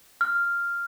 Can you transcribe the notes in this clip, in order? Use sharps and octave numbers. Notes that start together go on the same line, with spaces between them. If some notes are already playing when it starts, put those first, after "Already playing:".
F6